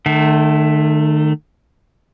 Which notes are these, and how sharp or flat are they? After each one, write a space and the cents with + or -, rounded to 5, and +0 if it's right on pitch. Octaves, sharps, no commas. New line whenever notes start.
D#3 -40 A3 +0